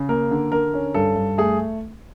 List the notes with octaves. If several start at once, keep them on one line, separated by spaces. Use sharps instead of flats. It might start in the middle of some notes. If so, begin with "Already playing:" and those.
Already playing: C#3
A#3 A#4
D3
D3 A#4
C#4
G2 A4
G2
A3 G#4